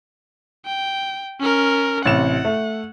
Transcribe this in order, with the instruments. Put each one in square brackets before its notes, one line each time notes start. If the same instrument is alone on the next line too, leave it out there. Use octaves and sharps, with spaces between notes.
[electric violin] G5
C#4 A#4
[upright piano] A1 C3 E7 [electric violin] F#5
[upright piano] A3